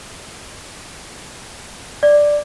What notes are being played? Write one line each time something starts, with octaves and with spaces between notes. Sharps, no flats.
D5